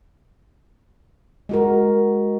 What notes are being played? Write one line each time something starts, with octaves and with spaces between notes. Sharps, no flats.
G#3 F#4 A#4